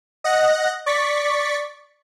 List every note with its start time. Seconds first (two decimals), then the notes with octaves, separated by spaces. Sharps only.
0.24 D#5 F#5 F#6 A#6
0.86 D5 C#6 A6 B6